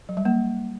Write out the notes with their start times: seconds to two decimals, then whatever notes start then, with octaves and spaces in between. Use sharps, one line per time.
0.09 F#3
0.17 G3
0.25 A#3